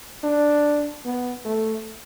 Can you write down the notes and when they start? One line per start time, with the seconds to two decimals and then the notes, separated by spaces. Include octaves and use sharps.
0.24 D4
1.05 B3
1.45 A3